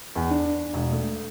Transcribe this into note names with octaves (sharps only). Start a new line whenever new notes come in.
E2
D4
E1
A3